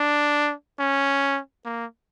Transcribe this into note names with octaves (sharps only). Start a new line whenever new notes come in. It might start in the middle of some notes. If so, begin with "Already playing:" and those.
Already playing: D4
C#4
A#3